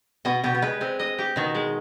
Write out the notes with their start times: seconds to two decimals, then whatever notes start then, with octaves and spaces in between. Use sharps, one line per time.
0.25 B2 B3 D#5
0.44 B2 B3 G4
0.55 B3
0.62 G#3 B4
0.81 G#3 C4
0.99 D#5
1.19 G4
1.36 B2 D#3
1.55 G#3